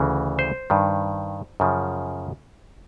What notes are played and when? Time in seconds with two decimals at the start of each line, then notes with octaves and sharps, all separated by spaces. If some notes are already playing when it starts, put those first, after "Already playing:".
Already playing: D2 C#3 E3
0.39 C5
0.70 G2 D#3
1.60 F#2 C#3 F3